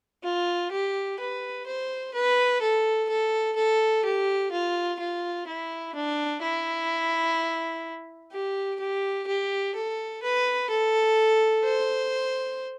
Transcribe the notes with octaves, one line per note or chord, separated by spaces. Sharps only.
F4
G4
B4
C5
B4
A4
A4
A4
G4
F4
F4
E4
D4
E4
G4
G4
G4
A4
B4
A4
C5